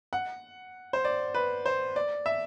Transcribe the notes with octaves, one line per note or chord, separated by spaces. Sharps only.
F#5
C5
D5
B4
C5
D5
E5